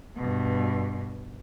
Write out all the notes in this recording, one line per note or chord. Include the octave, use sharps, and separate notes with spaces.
G2 B2